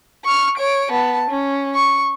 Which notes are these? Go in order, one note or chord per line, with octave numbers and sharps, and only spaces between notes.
C#6 F6
C#5 D7
B3 A5
C#4
C#6